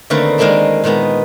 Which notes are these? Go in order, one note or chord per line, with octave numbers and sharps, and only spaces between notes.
D3 D#3 A3 A#3 C4 B4
D#3 G#3 A#3 C4 D4 E4
A#2 D#3 G#3 B3